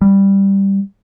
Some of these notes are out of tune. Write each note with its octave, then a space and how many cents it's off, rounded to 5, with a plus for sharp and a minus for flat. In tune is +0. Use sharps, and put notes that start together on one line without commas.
G3 +5